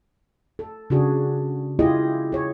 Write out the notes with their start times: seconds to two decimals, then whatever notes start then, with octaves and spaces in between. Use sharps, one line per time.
0.59 A4
0.90 C#3 D4 F#4 G#4
1.79 E4 F4 G4 G#4 D#5
2.32 G#4 C#5